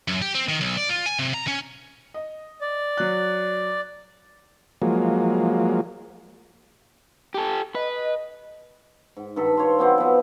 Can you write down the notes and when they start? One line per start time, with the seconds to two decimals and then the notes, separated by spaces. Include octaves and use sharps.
0.08 F#2
0.22 G4
0.35 C4
0.49 D#3
0.61 B1
0.77 D5
0.89 F4
1.06 G#5
1.19 C3
1.34 A#5
1.48 C#4
2.14 D#5
2.61 D5
2.97 F#3 F#6
4.82 F3 F#3 G#3 A#3
7.34 G4 A4
7.75 B4 D#5
9.17 G#2
9.36 G2 D#3 A4 B5
9.57 C5 C#5 F5 C6
9.79 F#3 B3 C4 D5
9.98 F3 B3